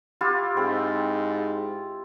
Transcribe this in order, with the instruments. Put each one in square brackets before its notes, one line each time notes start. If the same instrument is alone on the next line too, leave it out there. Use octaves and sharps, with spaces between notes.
[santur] E4 F4 G4
[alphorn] G#2 [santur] C4